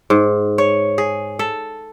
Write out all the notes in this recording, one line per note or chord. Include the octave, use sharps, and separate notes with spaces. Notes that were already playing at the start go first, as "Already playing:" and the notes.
G#2
C#5
G#4
A4